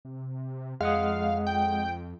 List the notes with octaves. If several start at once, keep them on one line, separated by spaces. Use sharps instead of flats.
C3
F2 G#3 F5 F#5 D#6
G5